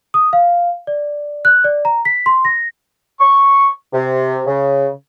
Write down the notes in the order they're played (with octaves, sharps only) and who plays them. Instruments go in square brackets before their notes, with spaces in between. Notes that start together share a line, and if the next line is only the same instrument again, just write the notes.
[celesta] D#6
F5
D5
F#6
D5
A#5
B6
C6
A#6
[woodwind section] C#6
C3
C#3